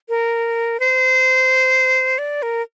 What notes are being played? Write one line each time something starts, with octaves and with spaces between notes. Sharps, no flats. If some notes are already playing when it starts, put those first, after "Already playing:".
A#4
C5
D5
A#4